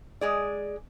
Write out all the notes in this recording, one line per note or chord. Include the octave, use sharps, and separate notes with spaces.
G#3 G#4 D5